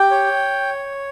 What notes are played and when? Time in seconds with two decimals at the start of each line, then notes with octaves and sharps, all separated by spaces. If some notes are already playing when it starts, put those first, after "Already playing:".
Already playing: G4 G5
0.11 C#5